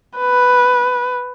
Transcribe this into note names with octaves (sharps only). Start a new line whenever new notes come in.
B4